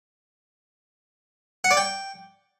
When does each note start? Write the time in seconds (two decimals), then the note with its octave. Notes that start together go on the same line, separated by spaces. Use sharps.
1.64 F#5
1.71 D5
1.77 G5